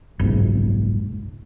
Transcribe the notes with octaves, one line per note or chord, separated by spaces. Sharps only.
F#1 B1 G#2